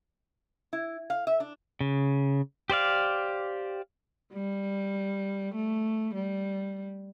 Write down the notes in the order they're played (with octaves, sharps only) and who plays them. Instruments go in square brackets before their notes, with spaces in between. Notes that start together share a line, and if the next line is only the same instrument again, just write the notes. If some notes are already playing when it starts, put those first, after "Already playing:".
[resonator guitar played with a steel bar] E4
F5
E5
D4
[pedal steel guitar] C#3
G4 C5 D5 F5
[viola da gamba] G3
A3
G3